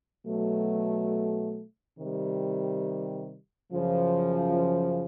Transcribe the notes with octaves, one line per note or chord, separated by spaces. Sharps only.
B2 F#3 A3
C3 D#3 G3
F#2 C#3 F3